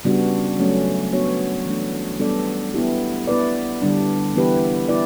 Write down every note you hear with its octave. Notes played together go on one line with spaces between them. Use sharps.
C#3 G3 B3 D4 F#4
F#3 A3 C#4
B3 D4 F#4 C#5
E3 A3 D4
G3 B3 D4 A4 D5
B3 E4 G4
B3 E4 B4 D5
D3 G3 D4
E3 B3 E4 G4 B4
B3 E4 B4 D5